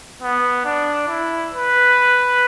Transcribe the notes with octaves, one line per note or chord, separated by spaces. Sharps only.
B3
D4
E4
B4